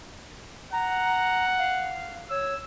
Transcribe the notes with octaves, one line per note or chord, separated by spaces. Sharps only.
F#5 A#5
F5
C#5 E6